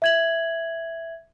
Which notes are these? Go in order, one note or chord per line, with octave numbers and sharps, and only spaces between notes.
E5 G#6 F#7